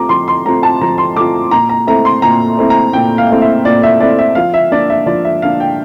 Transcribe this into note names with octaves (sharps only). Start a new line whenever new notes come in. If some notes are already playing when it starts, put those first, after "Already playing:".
Already playing: A3 C4 F4 A#5 D6
F3 C6
C6
A3 C4 F4 A#5
A5
F3 A#5
C6
A3 C4 F4 D6
A#2 A#5
A#5
A3 C4 E4 A#5
C6
A#2 A#5
A3 C4 E4
A#5
A#2 G5
F5
A3 C4 E4
E5
A#2 D5
E5
A3 C4 E4 D5
E5
F3 F5
E5
A#3 D4 D5
E5
F3 D5
E5
A#3 D4 F5
G5